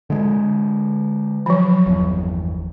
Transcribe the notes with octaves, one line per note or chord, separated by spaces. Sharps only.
D3 G#3
F3 F#3
G1 E2